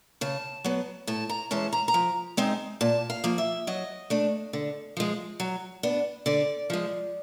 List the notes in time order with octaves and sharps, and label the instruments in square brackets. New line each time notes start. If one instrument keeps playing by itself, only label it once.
[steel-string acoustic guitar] C#3 A5
F#3 B3
A2 A5
A#5
E3 G#3 C#4 A5
A#5
A#5
F3
G#3 C4 D#4
A#2 A5
F5
F3 A#3
E5
F#3 D#5
A3 D4
D3
F3 G#3
F#3
B3 D4
D3 D5
F3 G#3